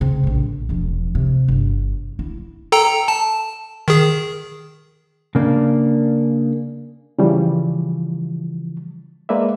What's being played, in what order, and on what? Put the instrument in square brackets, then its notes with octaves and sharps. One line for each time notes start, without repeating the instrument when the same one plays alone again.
[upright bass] C#3 C4
A#1 A2
E1 F3
C3
G1
E4
[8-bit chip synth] A4 G5 A#5
A5
D#3 G#4
[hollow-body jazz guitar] C#3 A#3 D4
[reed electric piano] C#3 E3 F3 G3
G#3 A#3 B4 D5 E5